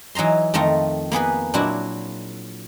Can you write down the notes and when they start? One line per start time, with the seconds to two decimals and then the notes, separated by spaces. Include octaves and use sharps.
0.15 E3 F#3 D#4 A#5 C6
0.54 F2 D#3 A3 F4 A#5
1.12 A#3 B3 G#4 B4
1.54 A#2 F#3 D4 E4 F#4